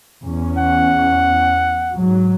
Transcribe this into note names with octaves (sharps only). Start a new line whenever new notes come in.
E2 C#4
F#5
G#2 F#3